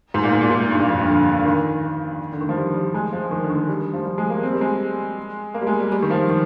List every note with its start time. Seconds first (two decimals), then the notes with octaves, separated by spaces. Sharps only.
0.14 G#2
0.23 A#2
0.33 G#2
0.41 A#2
0.50 G#2
0.71 G2
0.80 A#2
0.89 F2
0.98 G2
1.08 D3
1.40 D3
1.45 D#3
2.33 D3
2.41 D#3
2.49 F3
2.57 G3
2.75 G3
2.94 G#3
3.12 F3
3.31 D#3
3.44 D3
3.50 D#3
3.68 G3
3.93 F3
4.06 G3
4.18 G#3
4.30 A#3
4.43 C4
4.52 G3
4.61 G#3
5.54 A#3
5.61 G3
5.67 G#3
5.80 G3
5.92 G3
6.02 D#3
6.10 F3
6.29 D#3